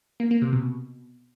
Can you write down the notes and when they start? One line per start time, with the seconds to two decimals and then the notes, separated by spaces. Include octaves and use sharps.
0.20 A#3
0.31 A#3
0.42 C3
0.53 B2